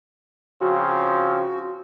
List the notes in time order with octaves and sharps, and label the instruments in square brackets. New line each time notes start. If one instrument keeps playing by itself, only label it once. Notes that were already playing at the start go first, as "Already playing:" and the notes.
[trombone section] C#3 F3 C4 [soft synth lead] F#4